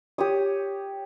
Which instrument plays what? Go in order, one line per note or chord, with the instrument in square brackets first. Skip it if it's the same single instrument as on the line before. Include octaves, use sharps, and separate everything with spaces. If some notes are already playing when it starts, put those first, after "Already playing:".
[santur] G4 C#5 D#6